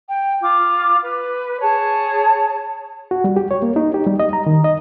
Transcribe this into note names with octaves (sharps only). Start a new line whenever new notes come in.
G5
F4 D6
B4
G#4 C#5 A5
F#4
G3
G4
C#5
A#3
D#4
G4
G3
D#5
A#5
D#3
D#5